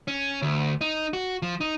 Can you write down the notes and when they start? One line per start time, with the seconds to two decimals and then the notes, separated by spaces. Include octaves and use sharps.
0.08 C#4
0.42 D2
0.81 D#4
1.13 F#4
1.42 F3
1.61 D#4